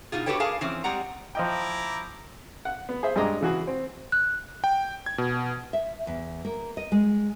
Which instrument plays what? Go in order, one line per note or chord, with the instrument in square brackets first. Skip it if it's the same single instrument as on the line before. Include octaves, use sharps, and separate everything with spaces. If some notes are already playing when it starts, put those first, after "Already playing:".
[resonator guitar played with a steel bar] B2 D#4 F4 G#4
F#4 G4 A4 B4 C#5 G5
G#4 A#4 F5 G#5 A5
E3 F3 C4 C#4
G3 G#3 C4 F#5 A#5
[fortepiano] F3 D#5 G5 [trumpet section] E4 A#5 D6
[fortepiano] F#5
B3
G#4 C5 E5
G2 G#3 D#5 A#5 D6
C#3 E3 F#4 G#4
C4
[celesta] F#6
[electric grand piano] G5
G#6
B2
[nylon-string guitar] E5
E2
A#3
D#5
G#3